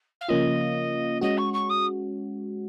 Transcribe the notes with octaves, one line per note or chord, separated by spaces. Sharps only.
F5
C#3 F3 A#3 C#4 F4 D#5
G#3 C#4 F#4 D#5
C#6
C#6
D#6